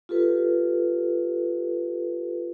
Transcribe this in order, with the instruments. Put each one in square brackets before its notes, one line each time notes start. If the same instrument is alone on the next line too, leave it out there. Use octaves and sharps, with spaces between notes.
[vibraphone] F4 G4 A4 B4